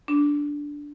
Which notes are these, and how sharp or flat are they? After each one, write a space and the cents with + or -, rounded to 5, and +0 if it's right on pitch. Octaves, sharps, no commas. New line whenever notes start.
D4 -10